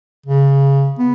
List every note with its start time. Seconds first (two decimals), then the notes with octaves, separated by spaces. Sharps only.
0.26 C#3
0.99 B3